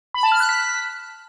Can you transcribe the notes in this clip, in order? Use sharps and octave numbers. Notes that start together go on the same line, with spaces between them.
B5
A5
F6
F#6
B6